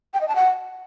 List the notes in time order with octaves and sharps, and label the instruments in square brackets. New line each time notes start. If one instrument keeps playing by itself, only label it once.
[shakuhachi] G5
D#5
A5
F#5